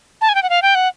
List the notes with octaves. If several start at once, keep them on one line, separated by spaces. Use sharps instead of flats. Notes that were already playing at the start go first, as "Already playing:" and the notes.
A5
G#5
G5
F#5
F5
G5
F#5